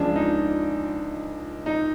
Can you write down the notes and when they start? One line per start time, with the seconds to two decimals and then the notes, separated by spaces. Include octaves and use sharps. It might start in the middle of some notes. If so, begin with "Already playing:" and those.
Already playing: C#2 C#3 F3 D4
0.16 D#4
1.66 D#4